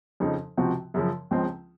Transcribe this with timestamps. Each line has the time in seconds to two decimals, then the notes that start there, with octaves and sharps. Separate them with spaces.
0.20 F2 C#3 F3 C4 D#4
0.57 C#2 C3 F3 C4 F#4
0.94 F#2 C#3 F3
1.31 C#2 C#3 F3 G#3 C4